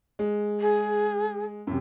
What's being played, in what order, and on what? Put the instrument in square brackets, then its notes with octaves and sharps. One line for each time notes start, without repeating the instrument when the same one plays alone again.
[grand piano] G#3
[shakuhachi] G#4
[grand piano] F#2 C3